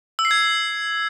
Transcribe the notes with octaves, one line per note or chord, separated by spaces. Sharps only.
E6
C7
G#6